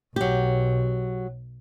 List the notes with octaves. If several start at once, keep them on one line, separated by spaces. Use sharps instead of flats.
B1 F#3 G4